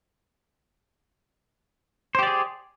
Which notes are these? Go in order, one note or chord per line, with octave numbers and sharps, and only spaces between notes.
G4 G#4 C5 D5